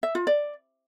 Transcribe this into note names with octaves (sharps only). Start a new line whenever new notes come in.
E5
F4
D5